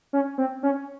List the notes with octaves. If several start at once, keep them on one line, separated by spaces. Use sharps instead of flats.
C#4
C4
C#4